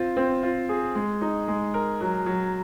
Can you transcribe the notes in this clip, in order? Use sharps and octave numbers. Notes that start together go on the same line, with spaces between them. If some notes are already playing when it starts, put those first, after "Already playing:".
Already playing: C4 F4
C4
F4
G#4
G#3
D#4
G#3
A#4
F#3
F#3